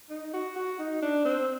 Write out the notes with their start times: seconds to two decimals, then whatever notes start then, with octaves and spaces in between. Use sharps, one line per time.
0.10 D#4
0.34 F#4
0.56 F#4
0.79 D#4
1.02 D4
1.25 C4